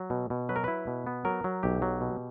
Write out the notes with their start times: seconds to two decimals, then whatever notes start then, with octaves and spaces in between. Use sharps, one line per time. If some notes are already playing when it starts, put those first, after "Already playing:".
Already playing: F#3
0.10 B2
0.30 B2
0.49 F#3 B4
0.56 A#4
0.64 E4 B4
0.87 B2
1.07 B3
1.25 F#3 A#4
1.44 F#3
1.63 B1 G4
1.82 F#3
2.01 B2